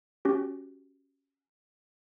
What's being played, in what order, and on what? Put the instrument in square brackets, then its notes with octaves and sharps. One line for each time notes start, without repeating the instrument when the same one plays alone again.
[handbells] C#4 F#4 G4